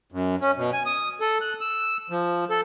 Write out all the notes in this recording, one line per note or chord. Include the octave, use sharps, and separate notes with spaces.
F#2
C#4
B2
G#5
D#6
A4
F#6
E6
F3
A4